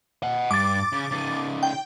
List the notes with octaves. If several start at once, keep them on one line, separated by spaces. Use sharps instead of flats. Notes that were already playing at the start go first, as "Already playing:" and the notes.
D#5 F#5
G2 D6 A6
C#3
C#3 D#4
G5